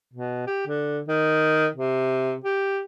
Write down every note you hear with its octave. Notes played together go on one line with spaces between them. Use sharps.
B2
G4
D3
D#3
C3
G4